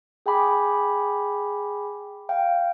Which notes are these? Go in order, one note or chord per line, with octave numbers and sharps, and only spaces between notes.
G#4 G5 G#5 B5 D6
F5 G5